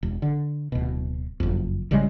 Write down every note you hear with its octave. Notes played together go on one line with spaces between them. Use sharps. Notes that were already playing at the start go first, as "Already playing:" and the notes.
E1
D3
D1 B2
F#1 F2
A1 C#3 G3 G#3